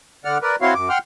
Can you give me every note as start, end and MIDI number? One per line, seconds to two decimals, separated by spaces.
0.25 0.38 50
0.25 0.38 74
0.25 0.38 78
0.25 0.38 89
0.42 0.56 70
0.42 0.56 71
0.42 0.56 74
0.62 0.74 60
0.62 0.74 64
0.62 0.74 66
0.62 0.74 73
0.62 0.74 77
0.62 0.74 84
0.74 0.89 42
0.74 0.89 86
0.89 0.98 78
0.89 0.98 79
0.89 0.98 84
0.89 0.98 89